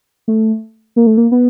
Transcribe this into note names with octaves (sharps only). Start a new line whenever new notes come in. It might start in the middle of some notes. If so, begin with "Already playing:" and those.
A3
A#3
A3
A#3
B3